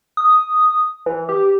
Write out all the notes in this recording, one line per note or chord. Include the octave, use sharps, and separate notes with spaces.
D#6
E3
G4